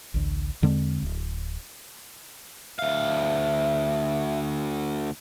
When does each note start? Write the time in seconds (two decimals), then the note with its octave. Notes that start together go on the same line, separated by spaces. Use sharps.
0.14 A1 D2
0.62 E2 D3 G#3 C4
1.02 D1
2.79 D2 E5 F5